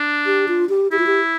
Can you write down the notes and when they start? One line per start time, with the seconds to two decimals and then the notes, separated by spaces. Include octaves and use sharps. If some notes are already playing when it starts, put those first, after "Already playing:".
Already playing: D4
0.26 G4
0.48 F4
0.69 G4
0.92 E4 G4
0.99 F4
1.07 G4